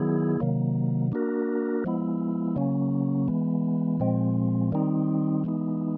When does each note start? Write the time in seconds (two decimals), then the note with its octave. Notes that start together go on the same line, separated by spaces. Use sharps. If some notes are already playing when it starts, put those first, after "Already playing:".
Already playing: D#3 F#3 B3 E4 G#4
0.40 C3 D#3 F#3 A#3
1.12 A#3 D4 F#4 A#4
1.84 F3 G#3 B3 E4
2.56 C#3 F#3 A#3 C#4
3.28 E3 G#3 B3
4.00 A#2 F3 G#3 C4
4.72 D#3 G3 C4 D#4
5.44 E3 G#3 B3 D#4